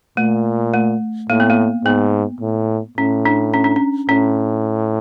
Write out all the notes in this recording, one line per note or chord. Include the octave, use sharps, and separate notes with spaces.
A#2 A3
A3
A2 A#3
B3
A#3
G#2 B3
A2
A2 C#4
D4
C#4
D4
C#4
A2 C#4